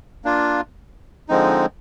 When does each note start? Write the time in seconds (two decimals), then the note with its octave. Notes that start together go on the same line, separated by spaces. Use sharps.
0.25 A#3 D4 F4
1.29 D3 F3 G#3 C4 D#4